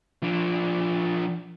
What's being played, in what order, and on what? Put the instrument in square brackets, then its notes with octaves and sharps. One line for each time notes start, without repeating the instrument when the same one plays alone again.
[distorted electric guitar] F3 D4